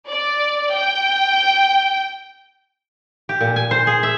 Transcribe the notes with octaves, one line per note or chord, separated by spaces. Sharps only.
D5
G5
G4
A#2
G#5
C5
G#4
E5